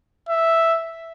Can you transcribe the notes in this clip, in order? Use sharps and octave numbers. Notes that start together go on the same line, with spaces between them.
E5